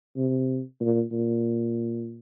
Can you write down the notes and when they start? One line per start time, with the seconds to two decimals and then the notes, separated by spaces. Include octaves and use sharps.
0.17 C3
0.80 A#2
1.12 A#2